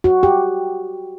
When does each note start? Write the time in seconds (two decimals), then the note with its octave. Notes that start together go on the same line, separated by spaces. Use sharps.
0.04 F#4
0.23 G4